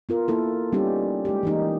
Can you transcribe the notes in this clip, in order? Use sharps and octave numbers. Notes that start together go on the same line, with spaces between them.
B3 F4 A#4
A#3 E4 A4
G3 B3 C#4 D#4 G4
G#3 G4
E3 A#3 D#4